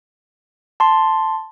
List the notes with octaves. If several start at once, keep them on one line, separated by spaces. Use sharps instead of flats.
A5 C6